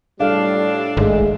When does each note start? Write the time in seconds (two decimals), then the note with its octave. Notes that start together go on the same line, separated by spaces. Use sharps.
0.20 A2 G3 D4 A4 F5
0.97 G#1 G#3 A3